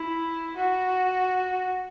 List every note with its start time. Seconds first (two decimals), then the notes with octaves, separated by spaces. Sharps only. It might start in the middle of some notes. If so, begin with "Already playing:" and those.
Already playing: E4
0.56 F#4